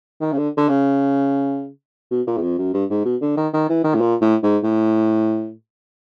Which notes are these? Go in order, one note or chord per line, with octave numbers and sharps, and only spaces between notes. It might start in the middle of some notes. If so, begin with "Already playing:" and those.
D#3
C#3
D3
D3
C#3
B2
A#2
E2
F2
F#2
G2
G#2
B2
D3
D#3
D#3
E3
D#3
A2
A#2
A2
G#2
A2